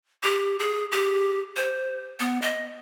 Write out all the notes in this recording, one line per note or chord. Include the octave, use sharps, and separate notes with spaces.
G4
G#4
G4
C5
B3
D#5